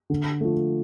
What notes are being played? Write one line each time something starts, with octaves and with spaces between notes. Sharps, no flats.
D3
F3 A3